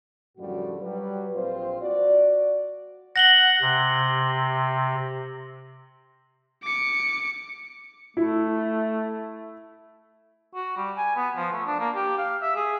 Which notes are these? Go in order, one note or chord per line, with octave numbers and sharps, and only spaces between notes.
F#2 A2 D3 F3 G3 F#4
F#3 G3 B4
A#1 A#2 C4 F4 C5
F#4 D5
F#5 A#6 F#7 G7
C3
D6 C#7
A3 E4
F#4
G3
G#5
B3
F3
A3
D4
A#3
G4
F5
E5
G#4